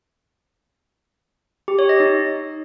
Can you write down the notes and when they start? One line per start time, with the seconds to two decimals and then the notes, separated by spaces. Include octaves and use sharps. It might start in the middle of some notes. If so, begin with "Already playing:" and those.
1.68 G4
1.79 C#5
1.89 D#5
2.00 D#4